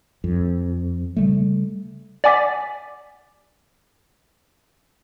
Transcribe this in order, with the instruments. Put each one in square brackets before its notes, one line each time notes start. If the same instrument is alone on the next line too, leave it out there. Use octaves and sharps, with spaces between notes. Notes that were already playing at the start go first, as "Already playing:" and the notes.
[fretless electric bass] F2
C#3 G3 A3
[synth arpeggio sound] D5 F#5 G#5 D6 A6 B6